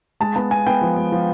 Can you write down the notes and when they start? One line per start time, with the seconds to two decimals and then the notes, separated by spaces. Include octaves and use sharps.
0.20 G#3 A5
0.36 B3 A5
0.51 B3 G#5
0.67 B3 G5
0.82 F3
0.97 G#3
1.12 F3